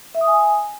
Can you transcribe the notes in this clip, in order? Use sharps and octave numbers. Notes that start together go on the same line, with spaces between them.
E5
D#6
G#5